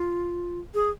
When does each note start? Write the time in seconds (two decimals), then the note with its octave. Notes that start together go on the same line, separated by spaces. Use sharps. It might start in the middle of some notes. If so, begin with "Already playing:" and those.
Already playing: F4
0.74 G#4